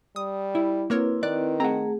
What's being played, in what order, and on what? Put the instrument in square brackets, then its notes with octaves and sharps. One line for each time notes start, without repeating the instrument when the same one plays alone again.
[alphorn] G3 [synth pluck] D#6
[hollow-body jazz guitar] E4
[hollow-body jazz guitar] A#3 [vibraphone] C4 E4 B4 [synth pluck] F#4 A#4 C#5
[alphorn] D#3 [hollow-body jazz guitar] D5 [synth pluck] F#6
[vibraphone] A3 G#4 [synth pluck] C4 [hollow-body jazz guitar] F#5 A#5